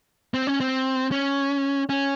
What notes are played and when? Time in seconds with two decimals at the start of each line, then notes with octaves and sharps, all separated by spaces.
0.34 C4
0.47 C#4
0.60 C4
1.12 C#4
1.89 C#4